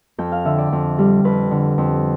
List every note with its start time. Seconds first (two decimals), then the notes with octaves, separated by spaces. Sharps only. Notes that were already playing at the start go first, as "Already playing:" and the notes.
0.18 F2 G5
0.32 F5
0.45 D3 E5
0.58 D5
0.72 F2
0.98 G3
1.24 F2 B4
1.51 D3
1.78 F2